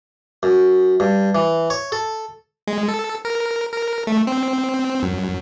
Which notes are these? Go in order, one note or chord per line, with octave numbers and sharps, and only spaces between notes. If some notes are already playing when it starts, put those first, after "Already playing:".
F#2
G2
E3
C#5
A4
G#3
A4
A#4
A#4
A3
C4
F#2